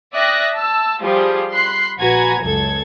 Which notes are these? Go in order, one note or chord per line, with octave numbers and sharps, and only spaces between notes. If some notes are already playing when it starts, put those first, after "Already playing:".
D5 E5 G5 D#6 F#6 A#6
A5 E6
F3 G3 F4 G4 G#4
B5 C6 F#6 C7
A#1 F#4 B4 G#5 A#5 G#6
C#2 F#2 A4 G#6